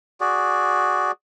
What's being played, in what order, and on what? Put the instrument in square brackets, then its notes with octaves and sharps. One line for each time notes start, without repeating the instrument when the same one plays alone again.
[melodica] F#4 G#4 D5